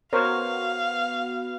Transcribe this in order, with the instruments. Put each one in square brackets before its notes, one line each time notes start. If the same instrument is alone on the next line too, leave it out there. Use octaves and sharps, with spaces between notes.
[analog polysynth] B3 F#4 [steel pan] A#4 C5 C#5 [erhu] F5